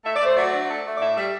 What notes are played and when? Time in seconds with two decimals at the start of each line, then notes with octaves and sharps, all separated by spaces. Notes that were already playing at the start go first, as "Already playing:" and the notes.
0.05 A3 E5
0.16 D5
0.21 A3 C5
0.37 F#3 D5
0.53 D4
0.70 A3
0.85 A3
0.97 D5
1.01 A2 E5
1.17 G3 E5